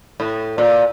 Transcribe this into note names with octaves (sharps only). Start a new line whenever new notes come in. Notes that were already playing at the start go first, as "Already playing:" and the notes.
A2
A#2